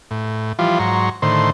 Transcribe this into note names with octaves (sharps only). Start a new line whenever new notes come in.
A2
E3 F3 G3 F4
G#2 F#3 A#5 C6 C#6
A2 D3 D#3 C5 C6